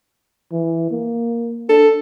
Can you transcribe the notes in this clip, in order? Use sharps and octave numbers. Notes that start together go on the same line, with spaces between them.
E3
A#3
D4 A4